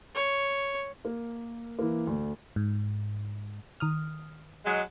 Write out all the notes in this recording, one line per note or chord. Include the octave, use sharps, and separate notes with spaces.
C#5
A#3
E3 A#3
D2
G#2
D#3 D#6 F6
F#3 G#3